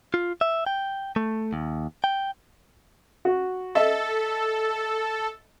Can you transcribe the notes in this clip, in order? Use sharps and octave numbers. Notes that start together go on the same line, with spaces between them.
F4
E5
G5
A3
D#2
G5
F#4
A4 D#5 E5